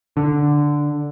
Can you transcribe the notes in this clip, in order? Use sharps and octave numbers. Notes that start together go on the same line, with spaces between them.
D3